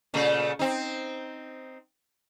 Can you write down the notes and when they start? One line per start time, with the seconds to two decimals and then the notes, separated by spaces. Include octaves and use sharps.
0.14 A#2 C#3 A3
0.59 C4 D#4